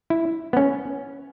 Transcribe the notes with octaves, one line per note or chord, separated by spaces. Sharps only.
E4
B3
C#4